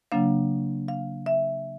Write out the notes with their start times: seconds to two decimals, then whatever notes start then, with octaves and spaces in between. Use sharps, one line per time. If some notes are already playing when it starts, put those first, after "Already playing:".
0.12 C#3 F#3 A#3 D4 F5
0.88 F5
1.26 E5